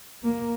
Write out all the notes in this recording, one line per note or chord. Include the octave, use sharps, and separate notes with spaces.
A#3